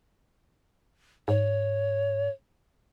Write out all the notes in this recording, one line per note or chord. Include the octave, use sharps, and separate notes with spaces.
G#2 C#5